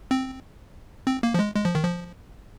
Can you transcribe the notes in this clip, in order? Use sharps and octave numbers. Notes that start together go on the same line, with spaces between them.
C4
C4
A#3
F3
G#3
G#3
F3
D#3
F3